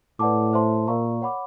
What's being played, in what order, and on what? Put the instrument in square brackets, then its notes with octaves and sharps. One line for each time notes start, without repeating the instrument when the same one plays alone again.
[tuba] A2 [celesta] B4 D5 F#5 A5 D6
[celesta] C5 E5 A5 C6
[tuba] A#2 [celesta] A#4 D5 F5 A#5 C#6
[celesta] C#5 F#5 B5 D6